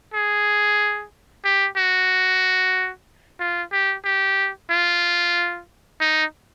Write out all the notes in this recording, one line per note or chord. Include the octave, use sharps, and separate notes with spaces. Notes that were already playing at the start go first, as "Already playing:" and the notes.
G#4
G4
F#4
F4
G4
G4
F4
D#4